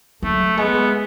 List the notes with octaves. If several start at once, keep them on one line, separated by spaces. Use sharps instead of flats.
F#3 A3
G#3 B3